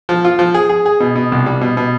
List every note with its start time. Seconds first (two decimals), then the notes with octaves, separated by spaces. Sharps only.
0.09 F3
0.24 F4
0.39 F3
0.54 G#4
0.69 G#4
0.86 G#4
1.00 B2
1.15 B2
1.32 C2
1.46 G3
1.61 B2
1.77 B2